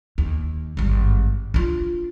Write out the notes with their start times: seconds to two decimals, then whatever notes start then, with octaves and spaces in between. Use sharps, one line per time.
0.18 D#2
0.77 G#1 G2
1.54 D4 F4